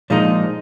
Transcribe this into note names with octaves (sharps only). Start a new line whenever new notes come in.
A#2 F3 G#3 D#4